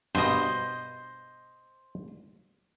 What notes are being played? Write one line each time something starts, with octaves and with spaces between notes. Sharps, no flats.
G2 B2 C5 D#5